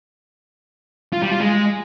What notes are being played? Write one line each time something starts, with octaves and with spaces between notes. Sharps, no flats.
F4
G3
F4
G#3